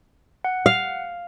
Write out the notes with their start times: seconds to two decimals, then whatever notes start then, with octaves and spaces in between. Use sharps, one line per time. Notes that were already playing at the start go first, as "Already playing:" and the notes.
0.44 F#5
0.66 F5